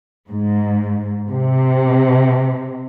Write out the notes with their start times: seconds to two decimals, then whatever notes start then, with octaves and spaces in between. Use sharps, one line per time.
0.29 G#2
1.29 C3